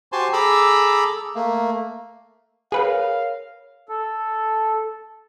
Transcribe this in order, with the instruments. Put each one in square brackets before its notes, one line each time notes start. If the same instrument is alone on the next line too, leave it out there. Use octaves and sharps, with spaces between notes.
[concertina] F#4 G4 C5 G#5 A5 C6
G#4 A4 A#5 B5 D6 E6
A3 A#3
[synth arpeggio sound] G#4 B4 F#5 [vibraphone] A#4 C#5 [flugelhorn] F5
[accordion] A4